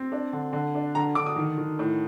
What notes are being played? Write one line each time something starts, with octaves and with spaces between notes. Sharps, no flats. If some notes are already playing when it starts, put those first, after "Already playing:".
Already playing: C4
D4
D3
D3
D4
D3 A#5
D3 D6
D#6
D#3
D#3
A2